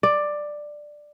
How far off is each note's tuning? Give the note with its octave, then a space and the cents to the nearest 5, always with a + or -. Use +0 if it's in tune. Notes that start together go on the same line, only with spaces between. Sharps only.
D5 +10